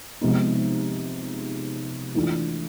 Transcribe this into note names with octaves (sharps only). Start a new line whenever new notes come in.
C3 F3 G#3 B3 D#4
E3 A3 D4 F4